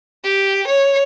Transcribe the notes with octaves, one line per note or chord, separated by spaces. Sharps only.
G4
C#5